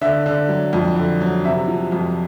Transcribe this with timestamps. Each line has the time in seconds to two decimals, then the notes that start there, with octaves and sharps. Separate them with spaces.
0.01 D3 E5
0.26 D3
0.49 F#3
0.73 F2
0.96 D3
1.21 F#3
1.44 C3 E5
1.68 F3
1.92 F2